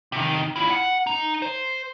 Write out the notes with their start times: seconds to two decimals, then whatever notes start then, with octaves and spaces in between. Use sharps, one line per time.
0.12 C3 D#3
0.56 E4 F4
0.71 F#5
1.07 D#4
1.42 C5